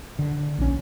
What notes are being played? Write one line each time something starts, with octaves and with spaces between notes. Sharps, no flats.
D3
A#1 C#4